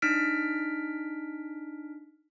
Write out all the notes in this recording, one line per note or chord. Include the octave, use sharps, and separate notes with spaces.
D4 D#4 F6 B6 D7